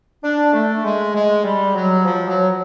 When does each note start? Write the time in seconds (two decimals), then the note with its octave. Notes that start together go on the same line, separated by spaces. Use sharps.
0.24 D4
0.53 A3
0.84 G#3
1.14 G#3
1.44 G3
1.75 F#3
2.05 F3
2.28 F#3